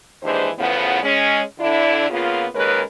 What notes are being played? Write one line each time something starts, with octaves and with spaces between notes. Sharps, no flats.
D#2 G#2 E3 G#3 D4 C5
E2 A2 C#3 F3 B3
G#3 C#4
D3 D4 E4
C#3 A#3 B3 F4
D#2 C#3 G#3 A#4 B4 C#5